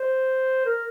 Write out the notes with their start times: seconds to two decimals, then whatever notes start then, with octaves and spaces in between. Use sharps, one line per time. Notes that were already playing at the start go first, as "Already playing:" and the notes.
Already playing: C5
0.65 A#4